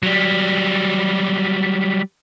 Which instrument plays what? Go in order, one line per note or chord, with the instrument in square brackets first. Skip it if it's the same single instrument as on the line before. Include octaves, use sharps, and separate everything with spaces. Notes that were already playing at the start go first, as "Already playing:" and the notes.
[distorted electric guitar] F#3 G3